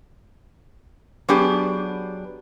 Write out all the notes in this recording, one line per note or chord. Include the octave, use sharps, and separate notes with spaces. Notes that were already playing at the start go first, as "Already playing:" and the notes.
F#3 B3 D4 G4 G#4